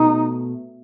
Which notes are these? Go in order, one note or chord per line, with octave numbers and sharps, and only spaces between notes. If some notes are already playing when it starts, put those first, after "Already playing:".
Already playing: B2 A3 D#4